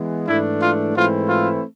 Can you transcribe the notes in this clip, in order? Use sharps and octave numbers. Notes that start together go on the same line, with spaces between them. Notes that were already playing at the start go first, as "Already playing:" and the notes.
Already playing: E3 G#3 B3
G#2 E3 A3 D4 E4
F4
G#2 E3 A3 C4 E4 F4
F4